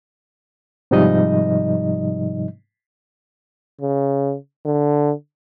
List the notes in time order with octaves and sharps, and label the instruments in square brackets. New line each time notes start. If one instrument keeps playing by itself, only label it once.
[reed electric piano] G#2 C3 F3 G3 D#4 D#5
[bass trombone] C#3
D3